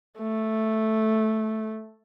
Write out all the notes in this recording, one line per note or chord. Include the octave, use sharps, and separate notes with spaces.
A3